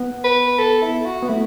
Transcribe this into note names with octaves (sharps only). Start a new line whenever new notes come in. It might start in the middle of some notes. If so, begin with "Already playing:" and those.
Already playing: B3
B4
A4
E4
F#4
B3
A3 E4